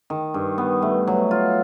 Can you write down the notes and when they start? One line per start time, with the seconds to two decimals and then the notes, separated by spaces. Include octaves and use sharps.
0.10 D#3
0.34 G2
0.58 B3
0.82 A3
1.07 F#3
1.31 F4